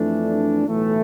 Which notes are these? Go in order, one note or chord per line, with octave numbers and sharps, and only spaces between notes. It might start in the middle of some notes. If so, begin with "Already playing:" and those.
Already playing: F2 E3 A3 D4
B1 A2 E3 A3